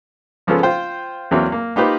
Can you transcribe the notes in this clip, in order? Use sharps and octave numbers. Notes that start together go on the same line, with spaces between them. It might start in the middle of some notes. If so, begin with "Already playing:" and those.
C#3 F3 G#3 B3 C#4 A4
F4 C5 G5
E2 E3 F#3 A#3 C4
A#3
A#3 D#4 F4 G4 B4 C5